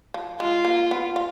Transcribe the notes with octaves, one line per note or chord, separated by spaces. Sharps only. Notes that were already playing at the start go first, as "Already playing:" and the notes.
F3
G#3 F4
A#3
B3
F4